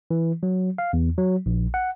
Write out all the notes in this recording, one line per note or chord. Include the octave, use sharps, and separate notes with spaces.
E3
F#3
F5
E2
F#3
A#1
F#5